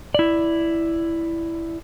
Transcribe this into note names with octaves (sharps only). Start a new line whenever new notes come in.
E4 D5